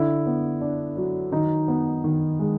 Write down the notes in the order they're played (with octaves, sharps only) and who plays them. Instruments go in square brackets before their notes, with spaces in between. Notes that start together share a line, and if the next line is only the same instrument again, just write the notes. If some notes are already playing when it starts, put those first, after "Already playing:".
Already playing: [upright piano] D3 [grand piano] E4
[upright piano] B3
D4
F#3
[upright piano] D#3 [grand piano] D#4
[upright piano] B3
D#3
G#3